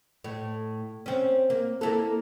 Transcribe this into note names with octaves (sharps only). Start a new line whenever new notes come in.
A2
C4 C#4
A#3
A#3 E4 A4